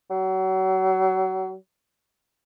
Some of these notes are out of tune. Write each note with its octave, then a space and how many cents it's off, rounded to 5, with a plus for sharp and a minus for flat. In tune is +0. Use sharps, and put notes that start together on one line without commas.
F#3 +30